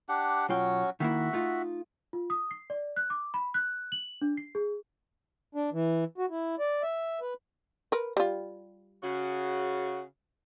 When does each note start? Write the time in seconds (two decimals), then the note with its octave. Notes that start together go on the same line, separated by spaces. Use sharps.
0.09 D4 G4 F#5
0.49 B1 F#3 C#4 F4 G5
1.00 D#3 A#3 E4 F#4 E5
1.33 A3 D#4 F4
2.13 F4
2.30 D#6
2.51 C7
2.70 D5
2.96 F#6
3.10 D6
3.34 B5
3.54 F#6
3.92 F#7
4.22 D4
4.37 C7
4.55 G#4
5.55 D4
5.73 E3
6.18 F#4
6.30 E4
6.59 D5
6.82 E5
7.21 B4
7.92 A#4 B4
8.17 G3 F4
9.03 C#3 F#4